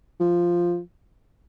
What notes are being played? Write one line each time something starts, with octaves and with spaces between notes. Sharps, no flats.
F3